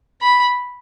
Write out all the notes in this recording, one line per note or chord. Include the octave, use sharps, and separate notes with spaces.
B5